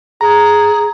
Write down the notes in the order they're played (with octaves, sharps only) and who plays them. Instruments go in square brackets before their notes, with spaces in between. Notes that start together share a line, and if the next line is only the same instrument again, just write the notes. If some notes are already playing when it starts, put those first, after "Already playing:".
[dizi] G#4 [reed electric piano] A#5